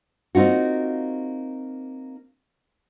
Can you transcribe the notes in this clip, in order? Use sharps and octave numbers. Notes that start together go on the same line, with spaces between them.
A#3 C4 D#4 F4 F#4